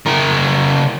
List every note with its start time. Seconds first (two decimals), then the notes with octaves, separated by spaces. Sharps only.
0.06 C#3 A#4